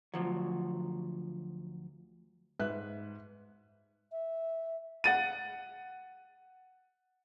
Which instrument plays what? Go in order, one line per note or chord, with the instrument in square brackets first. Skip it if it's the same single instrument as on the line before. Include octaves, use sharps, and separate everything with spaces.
[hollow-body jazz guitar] D2 F3 F#3
[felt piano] G#2 B4 E5 F#6
[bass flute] E5
[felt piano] F#5 A6 D#7